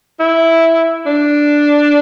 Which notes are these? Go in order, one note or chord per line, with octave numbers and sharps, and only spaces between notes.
E4
D4